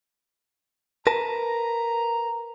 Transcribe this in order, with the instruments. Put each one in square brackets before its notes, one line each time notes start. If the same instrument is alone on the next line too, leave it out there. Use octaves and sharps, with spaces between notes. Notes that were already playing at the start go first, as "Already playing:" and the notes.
[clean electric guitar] A#4 B4 A5 [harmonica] A#5